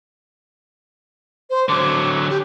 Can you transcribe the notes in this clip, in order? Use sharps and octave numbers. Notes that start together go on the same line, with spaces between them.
C5
D3 F#3 D6
G4